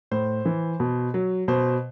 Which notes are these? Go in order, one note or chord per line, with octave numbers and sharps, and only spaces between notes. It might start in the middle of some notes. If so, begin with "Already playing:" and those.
A2 C5
E3
B2
F#3
B2 C5